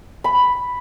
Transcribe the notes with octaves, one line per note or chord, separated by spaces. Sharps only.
B5